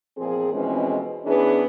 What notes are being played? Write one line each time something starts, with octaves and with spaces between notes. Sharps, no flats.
E2 A#2 F3 C4 G#4
F2 B2 E3 G#3 C4 C#4
E3 B3 C#4 D4 G#4